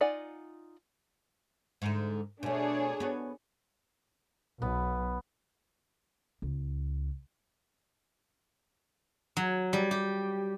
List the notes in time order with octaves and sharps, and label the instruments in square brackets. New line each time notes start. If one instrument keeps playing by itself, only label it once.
[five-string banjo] D#4 F4 D5 F#5 G#5
[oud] G#2 D3
[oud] B2 A3 [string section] D4 G#4 C#5
[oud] B3 F#4
[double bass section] B1 [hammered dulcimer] B3
[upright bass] C#2
[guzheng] F#3
G3
G4